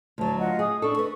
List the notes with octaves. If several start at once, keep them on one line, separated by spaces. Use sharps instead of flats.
D2 F#3 A5
F4 D#5 F#5
G#4 D#6
D4 A4 C#6
A4 B4 D#5